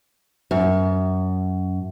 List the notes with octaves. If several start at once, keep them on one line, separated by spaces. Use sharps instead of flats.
F#2